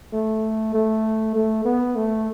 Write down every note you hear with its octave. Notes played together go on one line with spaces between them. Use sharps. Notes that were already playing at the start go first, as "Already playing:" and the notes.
A3
A3
A3
B3
A3